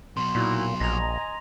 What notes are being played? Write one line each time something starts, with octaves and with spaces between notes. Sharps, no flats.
B2 F#3 C6
A#2 D#4 E4 F#4
A#1 D#5 G#5 A#5 A#6 F7